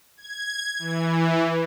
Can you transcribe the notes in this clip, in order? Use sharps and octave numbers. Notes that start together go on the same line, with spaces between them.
G#6
E3